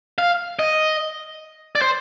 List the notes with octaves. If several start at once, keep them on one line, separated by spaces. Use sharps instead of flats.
F5
D#5
D5
C5